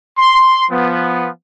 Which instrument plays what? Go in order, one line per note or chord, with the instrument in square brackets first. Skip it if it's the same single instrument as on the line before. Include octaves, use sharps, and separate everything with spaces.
[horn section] C6
F3 B3